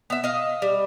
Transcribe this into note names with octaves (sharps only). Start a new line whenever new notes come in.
B3 E5
D#5 F5
G3